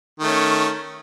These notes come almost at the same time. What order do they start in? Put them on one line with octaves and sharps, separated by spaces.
D#3 A3 C#4